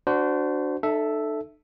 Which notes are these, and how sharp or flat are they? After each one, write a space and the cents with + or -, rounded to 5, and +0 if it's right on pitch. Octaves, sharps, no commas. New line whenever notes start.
D4 +0 F#4 +0 C5 -25
D#4 -45 A4 +0 E5 +0